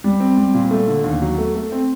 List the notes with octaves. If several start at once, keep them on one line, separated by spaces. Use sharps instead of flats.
G3
C4
G3
A#2
A3
D3
D#2
F#3
A3
A3
C4